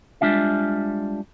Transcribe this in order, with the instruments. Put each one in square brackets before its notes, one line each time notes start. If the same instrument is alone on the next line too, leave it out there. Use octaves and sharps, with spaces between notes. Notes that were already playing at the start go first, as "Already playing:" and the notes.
[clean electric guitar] G3 G#3 D4 F4 E5